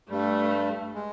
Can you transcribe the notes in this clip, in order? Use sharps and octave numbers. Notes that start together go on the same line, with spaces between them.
G2 G3 A3
G#3